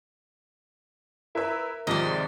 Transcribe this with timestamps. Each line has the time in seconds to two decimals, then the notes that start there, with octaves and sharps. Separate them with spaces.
1.35 E4 A#4 B4 E5
1.87 G#1 G#2 C3 F3 D5 D#5